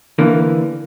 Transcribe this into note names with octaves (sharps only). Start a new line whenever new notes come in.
D3 E3 A#3